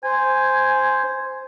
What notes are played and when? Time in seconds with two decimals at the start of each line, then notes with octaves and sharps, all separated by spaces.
0.04 C5 G#5